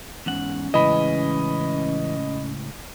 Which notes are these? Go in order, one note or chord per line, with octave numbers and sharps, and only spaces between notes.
E2 G#2 C#4 F#5
A2 C#3 E3 G#3 D#5 B5